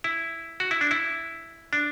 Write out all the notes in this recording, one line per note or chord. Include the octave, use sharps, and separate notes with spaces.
E4
F#4
E4
D4
E4
D4